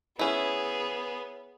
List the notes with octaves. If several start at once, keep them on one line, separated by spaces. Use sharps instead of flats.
B3 C#4 E4 G#4